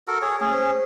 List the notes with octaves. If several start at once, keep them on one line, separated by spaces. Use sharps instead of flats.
F#4 A4 A#4
G#4 C#5
A3 C#4 G#4
C5